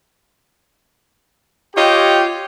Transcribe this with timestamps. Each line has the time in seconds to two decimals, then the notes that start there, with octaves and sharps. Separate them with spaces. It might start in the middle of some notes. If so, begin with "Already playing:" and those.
1.75 F4 G4 C#5 D#5 G5